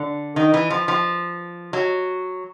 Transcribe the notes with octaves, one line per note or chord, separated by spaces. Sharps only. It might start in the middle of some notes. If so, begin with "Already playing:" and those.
Already playing: D3
D#3
E3
F3
F3
F#3